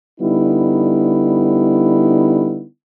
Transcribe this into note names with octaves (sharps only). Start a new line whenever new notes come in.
D3 G3 B3 D#4 E4